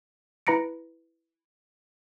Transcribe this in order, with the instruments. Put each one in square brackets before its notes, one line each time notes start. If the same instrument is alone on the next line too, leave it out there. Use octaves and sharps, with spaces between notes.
[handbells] E4 B4 A#5 A#6 C#7 D7